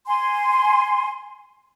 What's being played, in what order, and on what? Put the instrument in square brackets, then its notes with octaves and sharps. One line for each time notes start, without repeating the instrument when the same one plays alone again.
[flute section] G#5 C6